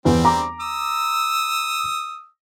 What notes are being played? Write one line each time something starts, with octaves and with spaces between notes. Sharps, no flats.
E2 G3 B3 C4
A#5 D6
D#6 E6